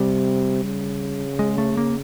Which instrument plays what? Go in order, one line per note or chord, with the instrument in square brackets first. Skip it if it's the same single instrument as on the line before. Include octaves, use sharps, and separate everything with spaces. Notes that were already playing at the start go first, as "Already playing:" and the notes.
Already playing: [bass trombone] C3 [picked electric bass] G3
[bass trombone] C#3
[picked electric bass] G#3
A3
A#3